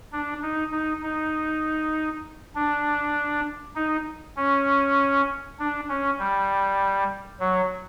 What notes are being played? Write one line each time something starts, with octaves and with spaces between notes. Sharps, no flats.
D4
D#4
D#4
D#4
D4
D#4
C#4
D4
C#4
G3
F#3